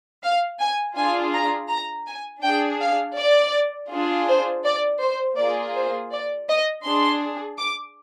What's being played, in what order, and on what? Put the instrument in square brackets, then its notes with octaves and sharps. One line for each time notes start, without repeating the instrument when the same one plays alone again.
[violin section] F5
G#5
D4 F4 G#4 G#5
A#5
A#5
G#5
D4 G#4 G5
F5
D5
D4 F4 G#4
C5
D5
C5
A#3 F4 G#4 D5
C5
D5
D#5
D4 G#4 C6
D6